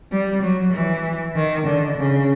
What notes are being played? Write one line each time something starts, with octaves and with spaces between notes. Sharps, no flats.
G3
F#3
E3
D#3
D3
C#3